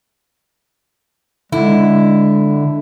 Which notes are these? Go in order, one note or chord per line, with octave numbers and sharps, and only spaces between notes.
D3 G#3 E4